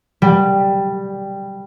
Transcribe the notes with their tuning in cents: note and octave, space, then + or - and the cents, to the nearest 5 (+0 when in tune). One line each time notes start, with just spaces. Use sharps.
G3 +0